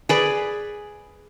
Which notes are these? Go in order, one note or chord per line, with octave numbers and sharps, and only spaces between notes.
G#4 B4 D5